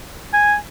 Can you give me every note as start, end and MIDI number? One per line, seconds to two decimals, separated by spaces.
0.34 0.55 80